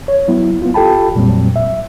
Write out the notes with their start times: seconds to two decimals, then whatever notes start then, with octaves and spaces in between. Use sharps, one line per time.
0.08 C#5
0.28 F#3 B3 E4
0.62 B3 F4
0.74 F4 G4 A4 G5 A5 B5
1.15 F2 A#2 F#3 G3 C4
1.56 E5